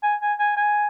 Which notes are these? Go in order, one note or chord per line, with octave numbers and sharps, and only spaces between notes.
G#5
G#5
G#5
G#5